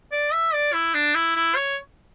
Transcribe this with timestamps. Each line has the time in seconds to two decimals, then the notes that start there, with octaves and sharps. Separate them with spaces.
0.12 D5
0.33 E5
0.54 D5
0.73 E4
0.94 D4
1.15 E4
1.36 E4
1.56 C#5